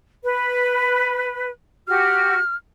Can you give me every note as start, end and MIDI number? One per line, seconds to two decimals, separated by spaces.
0.24 1.49 71
1.88 2.40 66
1.88 2.40 67
1.88 2.56 89